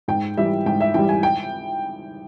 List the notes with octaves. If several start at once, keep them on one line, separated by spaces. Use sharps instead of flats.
G#2 G5
E3 G3 E5
G#2 G5
E5
E3 G3 G5
G#5
G5